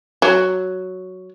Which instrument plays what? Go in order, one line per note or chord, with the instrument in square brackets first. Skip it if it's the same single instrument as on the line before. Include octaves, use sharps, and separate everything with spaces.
[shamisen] F#3